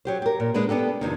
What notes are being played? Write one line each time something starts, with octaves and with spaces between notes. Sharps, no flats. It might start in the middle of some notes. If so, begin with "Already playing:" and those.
F#3 G4 C5
G4 A#4
A#2
G#3 A#3 D4 B4
B3 D4 G4 A4
F2 C3 D#3